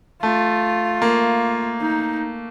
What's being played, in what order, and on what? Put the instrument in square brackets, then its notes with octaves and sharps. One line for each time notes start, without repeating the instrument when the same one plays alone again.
[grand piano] A3 [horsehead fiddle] F4
[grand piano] A#3
[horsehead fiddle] D#4